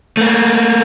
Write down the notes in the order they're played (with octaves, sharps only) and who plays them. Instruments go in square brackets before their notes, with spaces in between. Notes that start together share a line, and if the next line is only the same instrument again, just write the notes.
[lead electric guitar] A3 A#3